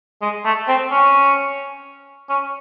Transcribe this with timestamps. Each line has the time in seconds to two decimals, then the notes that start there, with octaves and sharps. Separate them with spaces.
0.22 G#3
0.45 A3
0.68 C4
0.91 C#4
2.29 C#4